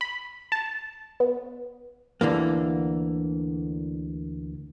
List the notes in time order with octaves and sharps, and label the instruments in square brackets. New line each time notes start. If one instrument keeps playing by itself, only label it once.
[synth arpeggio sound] B5
A5
B3
[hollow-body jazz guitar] D2 D3 E3 A#3